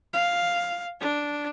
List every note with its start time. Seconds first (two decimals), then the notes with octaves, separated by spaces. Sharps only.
0.13 F5
1.00 D4